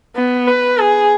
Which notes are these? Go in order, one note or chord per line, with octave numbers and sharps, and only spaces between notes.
B3
B4
G#4